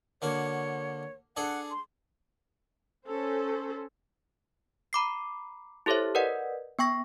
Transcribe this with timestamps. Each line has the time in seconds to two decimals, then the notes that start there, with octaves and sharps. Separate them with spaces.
0.22 D3 A#3 F#4 C#5
1.37 D4 G#4 A4 F#5
1.71 C6
3.08 C#4 A4 C5
4.93 A#5 B5 D6 C7
5.86 E4 G4 A4 C5 C#5 E5
6.15 A#4 B4 D5 D#5 F#5
6.79 B3 G5 C#6 A#6